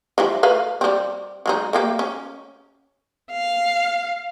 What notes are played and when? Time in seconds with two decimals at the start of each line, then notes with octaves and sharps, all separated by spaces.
0.18 E3 F3 G3
0.43 A3 B4 F5
0.81 G3 C4
1.46 F#3 G#3 D#4
1.73 A3 A#3 G4
1.99 C#4
3.31 F5